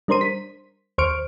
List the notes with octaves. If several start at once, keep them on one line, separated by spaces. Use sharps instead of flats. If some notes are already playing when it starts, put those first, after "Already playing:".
G3 D4 A#4 C5 C6 D#7
B6
D#2 C5 C#6 F6 D7